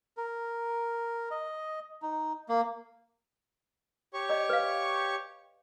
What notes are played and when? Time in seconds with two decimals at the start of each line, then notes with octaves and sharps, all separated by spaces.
0.17 A#4
1.31 D#5
2.02 D#4
2.49 A#3
4.14 G4 C#5 C#6
4.29 D5 D#5
4.49 B4 F5